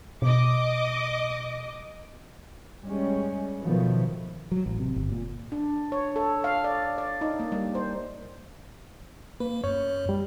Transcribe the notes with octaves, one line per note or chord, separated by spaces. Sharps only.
B2 D#5 D6
G3 G#3 C#4
B2 D#3 F3 F#3 A3 B3
F#3
A1
C3
G1
A#2
D4
C#5
A4
F5
D5
D5
D#4
A#3
G3
C5
A#3 B4
F#2 C#5
G3